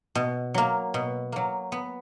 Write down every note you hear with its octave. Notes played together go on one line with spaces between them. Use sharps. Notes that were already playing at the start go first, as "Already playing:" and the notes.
B2
F#3 A#3
B2
F#3 A#3
B3